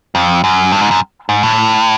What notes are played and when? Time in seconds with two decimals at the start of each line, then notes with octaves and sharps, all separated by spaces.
0.15 F2
0.44 F#2
0.72 G2
0.81 G#2
0.91 F#2
1.29 G#2
1.43 A2